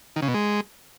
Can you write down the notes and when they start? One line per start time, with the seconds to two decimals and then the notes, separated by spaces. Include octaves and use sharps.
0.16 D#3
0.22 C#3
0.28 B2
0.34 G#3